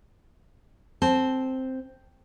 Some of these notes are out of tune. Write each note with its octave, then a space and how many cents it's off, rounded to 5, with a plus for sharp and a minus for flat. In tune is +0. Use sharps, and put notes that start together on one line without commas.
C4 +0 A5 -15